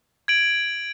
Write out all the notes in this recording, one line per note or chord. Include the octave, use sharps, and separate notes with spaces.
G#6 D7 F#7